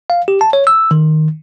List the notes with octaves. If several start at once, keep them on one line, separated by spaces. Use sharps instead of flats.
F5
G4
A5
C#5
E6
D#3